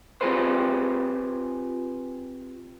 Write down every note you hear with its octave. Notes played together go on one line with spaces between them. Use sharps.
C4 F4 G4 G#4 B4 C5